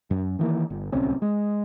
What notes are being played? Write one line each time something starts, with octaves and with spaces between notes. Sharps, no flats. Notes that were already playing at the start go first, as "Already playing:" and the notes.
F#2
D#3 E3 A#3
G1
D1 C2 C4 C#4
G#3